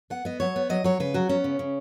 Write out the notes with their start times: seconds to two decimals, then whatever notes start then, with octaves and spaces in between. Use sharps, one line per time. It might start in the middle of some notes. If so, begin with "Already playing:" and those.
0.10 B3 F#5
0.25 B3 D#5
0.40 F#3 C#5
0.56 B3
0.69 F#3 D#5
0.84 F#3 C#5
1.00 C#3 B4
1.14 F#3 F#4
1.29 B3 C#4
1.44 C#3
1.59 C#3